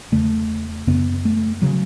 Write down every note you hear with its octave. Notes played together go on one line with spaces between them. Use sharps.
E2 C#3 A3
F#2 C#3 B3
A3
C#3 F#3